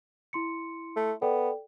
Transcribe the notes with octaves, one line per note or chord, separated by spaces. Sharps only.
E4 C6 C#7
A3
B3 A4 D5 G5